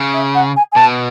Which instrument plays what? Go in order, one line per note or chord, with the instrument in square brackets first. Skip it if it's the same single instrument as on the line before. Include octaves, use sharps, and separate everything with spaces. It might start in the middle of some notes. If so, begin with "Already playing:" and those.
Already playing: [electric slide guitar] C#3
[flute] E5
F#5
G#5
G#5
[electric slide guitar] B2 [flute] A5